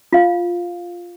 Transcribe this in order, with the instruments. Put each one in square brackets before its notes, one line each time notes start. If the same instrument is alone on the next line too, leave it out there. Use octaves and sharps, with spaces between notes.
[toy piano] F4 F5